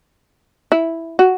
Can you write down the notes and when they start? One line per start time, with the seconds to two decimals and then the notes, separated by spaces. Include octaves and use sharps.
0.72 E4
1.19 F#4